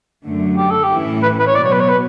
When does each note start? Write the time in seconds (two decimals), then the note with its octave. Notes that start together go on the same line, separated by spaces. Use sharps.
0.25 F#2 D3 A3
0.57 G4
0.71 A4
0.84 G4
0.90 A2 E3 A3 C#4 E4
1.23 B4
1.39 B4
1.47 C#5
1.55 B2 F#3 B3 D5
1.64 C#5
1.72 B4
1.80 C#5
1.88 B4